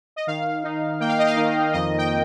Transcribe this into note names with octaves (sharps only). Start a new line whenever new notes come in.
D#5
D#3 F5
D#4
A#3 G5
F5
D#5
F5
D#3
F2 D#5
G5